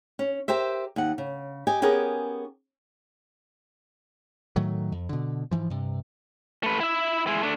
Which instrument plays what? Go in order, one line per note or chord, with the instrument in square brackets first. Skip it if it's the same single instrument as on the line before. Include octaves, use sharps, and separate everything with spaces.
[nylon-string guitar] C#4
G4 A#4 C5 E5
D#2 F#5
C#3
G4 D#5 G#5
B3 C#4 G4 G#4 A#4
[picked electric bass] A2 D#3 F#3 A3
F2
B2 D3
G#2 C#3 E3 F3
G2 C3
[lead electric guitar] A3 B4
E4 E5
G#3 E4
A3 D4